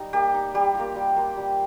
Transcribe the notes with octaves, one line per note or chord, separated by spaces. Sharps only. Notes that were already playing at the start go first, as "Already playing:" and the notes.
Already playing: G3 D#4
A#3 G4
D#4
G3 G4
A#3 F4
G3
A#3 F4
G3